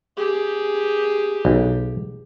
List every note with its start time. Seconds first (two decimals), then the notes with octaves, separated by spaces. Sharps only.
0.17 G4 G#4
1.45 B1